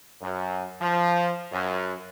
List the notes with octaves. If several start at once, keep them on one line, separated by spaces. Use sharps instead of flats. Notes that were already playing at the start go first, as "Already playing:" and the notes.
F#2
F3
F#2